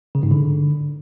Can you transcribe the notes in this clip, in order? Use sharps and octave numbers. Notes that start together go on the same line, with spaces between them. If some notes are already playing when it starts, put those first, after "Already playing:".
C#3
G#2
D3